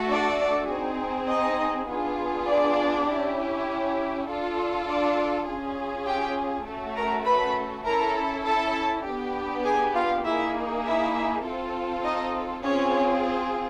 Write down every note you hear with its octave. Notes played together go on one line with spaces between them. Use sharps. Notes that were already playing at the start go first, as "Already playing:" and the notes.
Already playing: A3 F#4 A4
D4 D5
C4 D#4 G#4
D#4 D#5
B3 D4 F4 G#4
D4 D5
C#4 E4 G4
D4 F4 A4
D4 D5
C#4 F4 G#4
G4 G5
A3 C#4 F#4 A4
A#4 A#5
B4 B5
C#4 E4 A4 A#4 A#5
A4 A5
B3 D4 G4
G#4 G#5
F4 F5
A#3 D#4 E4 G#4 E5
E4 E5
C4 F4 A4
D#4 D#5
C4 C#4 F4 G#4 C#5